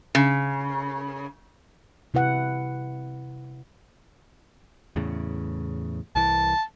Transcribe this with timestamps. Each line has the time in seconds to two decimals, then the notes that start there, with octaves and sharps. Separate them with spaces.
0.15 C#3
2.14 C3 E4 B4 F#5
4.96 E2 A2 C#3
6.15 C2 E3 A5